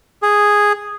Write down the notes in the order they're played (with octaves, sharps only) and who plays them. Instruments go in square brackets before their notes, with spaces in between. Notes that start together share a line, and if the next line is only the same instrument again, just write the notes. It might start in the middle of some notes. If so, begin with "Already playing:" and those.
[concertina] G#4